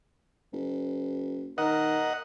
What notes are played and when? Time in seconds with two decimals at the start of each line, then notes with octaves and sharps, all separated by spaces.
0.53 F#1
1.58 D#3 A#4 D#5 F#5